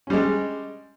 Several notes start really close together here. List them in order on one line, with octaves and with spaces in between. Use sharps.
C#4 G3 G#3